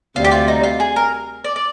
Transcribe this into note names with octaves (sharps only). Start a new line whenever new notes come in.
D2 C3 G3 F4
G4
F4
D#4
F4
G#4
A#4
D5
D5